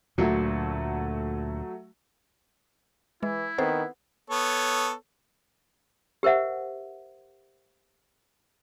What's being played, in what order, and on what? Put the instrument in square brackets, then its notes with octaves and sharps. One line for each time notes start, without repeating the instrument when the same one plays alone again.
[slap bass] D2 A#2 [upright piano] F#3 A3 F#4
[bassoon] E3 [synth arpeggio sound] G#3 [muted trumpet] E4
[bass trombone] D#3 [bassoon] B3 [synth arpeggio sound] C4 A4 C5
[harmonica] B3 A4 C#5
[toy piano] G4 A#4 C5 E5 F#5